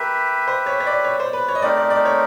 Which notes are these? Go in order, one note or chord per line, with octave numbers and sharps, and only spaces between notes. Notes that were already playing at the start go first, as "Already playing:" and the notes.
Already playing: G4 A#4 B4 E5
C5
C#5
C#5
D5
C#5
C5
B4
C#5
D#5
A3 C4 D#4 G4 A#4 D5
D5
D5
C#5